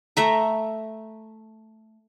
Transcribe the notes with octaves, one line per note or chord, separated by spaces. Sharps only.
A3 E5 A#5